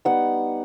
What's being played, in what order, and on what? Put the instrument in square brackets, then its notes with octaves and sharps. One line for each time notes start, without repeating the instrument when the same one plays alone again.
[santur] G3 B3 D#4 F#5